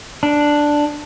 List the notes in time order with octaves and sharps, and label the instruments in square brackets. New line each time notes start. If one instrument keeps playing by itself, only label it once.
[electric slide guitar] D4